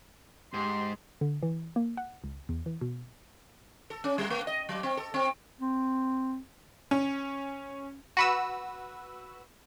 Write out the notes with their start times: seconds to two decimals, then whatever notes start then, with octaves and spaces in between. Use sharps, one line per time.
0.54 G#2 G4 C6
1.21 D3
1.43 E3
1.76 A#3
1.97 F#5
2.24 C#2
2.49 E2
2.66 E3
2.81 B2
3.90 A4
4.04 C#4
4.18 G3
4.30 A3
4.47 D#5
4.69 F#3
4.83 C4
4.97 A4
5.14 C4
5.61 C4
6.91 C#4
8.17 F#4 B4 E6